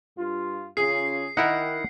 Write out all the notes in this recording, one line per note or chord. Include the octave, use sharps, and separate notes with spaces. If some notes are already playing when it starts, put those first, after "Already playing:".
G2 F4
C#3 C#4 F4 G#4 C7
D#3 D#4 E4 A#4 F#5